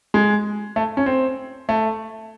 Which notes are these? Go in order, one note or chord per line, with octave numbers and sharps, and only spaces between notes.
G#3
A3
C#4
C4
A3